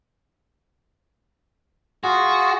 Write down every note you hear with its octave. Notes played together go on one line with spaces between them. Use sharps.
F4 F#4 G#4